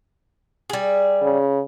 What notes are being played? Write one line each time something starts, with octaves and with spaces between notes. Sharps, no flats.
G3 G#4
C#3